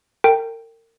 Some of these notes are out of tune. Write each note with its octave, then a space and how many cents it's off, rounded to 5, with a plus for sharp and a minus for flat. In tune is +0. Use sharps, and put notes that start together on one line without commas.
A#4 -35 G5 +0